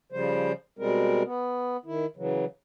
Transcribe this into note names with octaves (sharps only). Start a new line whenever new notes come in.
C#3 F3 G3 C5
B2 G3 G#3 C4 A#4
B3
D#3 E4
C#3 E3 F#3